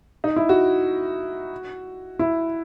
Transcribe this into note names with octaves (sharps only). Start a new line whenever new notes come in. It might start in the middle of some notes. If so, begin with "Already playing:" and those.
D#4
E4
F#4
E4